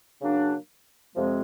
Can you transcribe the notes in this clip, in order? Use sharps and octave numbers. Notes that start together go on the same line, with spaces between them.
C#3 F#3 A#3 D4
F2 C3 F3 G#3 C4